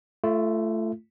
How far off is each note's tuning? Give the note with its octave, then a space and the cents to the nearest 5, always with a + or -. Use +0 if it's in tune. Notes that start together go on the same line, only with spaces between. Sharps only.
A3 +0 F4 -35